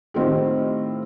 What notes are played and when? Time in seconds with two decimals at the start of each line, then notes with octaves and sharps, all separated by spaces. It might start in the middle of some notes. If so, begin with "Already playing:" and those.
0.14 A2 D#3 C4 F4 G4